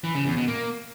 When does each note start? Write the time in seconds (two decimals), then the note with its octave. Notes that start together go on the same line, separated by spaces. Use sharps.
0.04 E3
0.15 C#3
0.26 E2
0.37 B2
0.48 A#3